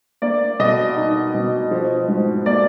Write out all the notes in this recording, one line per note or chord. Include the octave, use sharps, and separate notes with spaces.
A#3 D5
B2 D#5
D#4
B2
F3
G#2
A#3 D5